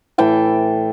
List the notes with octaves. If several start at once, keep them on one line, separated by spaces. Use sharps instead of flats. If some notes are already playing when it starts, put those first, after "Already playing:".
A2 E3 G5 A5